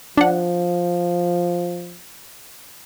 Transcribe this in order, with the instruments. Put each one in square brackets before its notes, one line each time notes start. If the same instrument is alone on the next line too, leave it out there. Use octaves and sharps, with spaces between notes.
[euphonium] F3 [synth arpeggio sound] D4 F#5